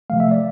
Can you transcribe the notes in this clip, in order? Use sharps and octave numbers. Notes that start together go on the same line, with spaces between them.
C3 F3 A3 F5
E5
D5